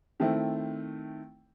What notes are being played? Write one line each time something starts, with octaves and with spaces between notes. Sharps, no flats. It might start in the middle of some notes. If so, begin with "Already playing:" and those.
D#3 A3 C4 E4